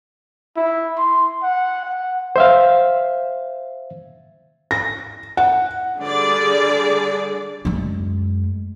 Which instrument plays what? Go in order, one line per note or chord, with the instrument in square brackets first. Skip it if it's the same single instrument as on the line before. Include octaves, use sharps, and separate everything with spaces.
[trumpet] E4
C6
F#5
F#5
[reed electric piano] C5 E5 F5
[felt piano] A#6
F#5
[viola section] D3 G3 G#4 D5
[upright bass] F#2 G#3